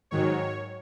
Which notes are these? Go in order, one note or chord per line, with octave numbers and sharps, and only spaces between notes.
G#2 D#3 F#3 C#5